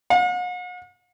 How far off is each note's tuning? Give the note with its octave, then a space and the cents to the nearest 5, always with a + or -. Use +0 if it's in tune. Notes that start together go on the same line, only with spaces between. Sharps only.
F#5 -45